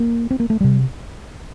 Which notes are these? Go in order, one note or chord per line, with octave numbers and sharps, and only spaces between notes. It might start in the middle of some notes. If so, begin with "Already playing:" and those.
Already playing: A#3
C4
A#3
A3
C3 G3